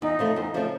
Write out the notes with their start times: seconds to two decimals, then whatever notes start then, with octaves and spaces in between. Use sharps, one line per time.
0.01 E2 D#4
0.19 C#3 F3 A3
0.36 E2
0.54 C#3 F3 A3